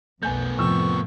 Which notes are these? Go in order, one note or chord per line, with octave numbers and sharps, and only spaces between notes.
B1 F2 A3 B3 G#5 G6
F2 A2 C3 F3 C#6 E6